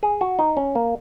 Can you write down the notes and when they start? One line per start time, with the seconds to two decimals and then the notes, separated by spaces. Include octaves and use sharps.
0.03 G#4
0.21 F#4
0.39 D#4
0.57 C#4
0.75 A#3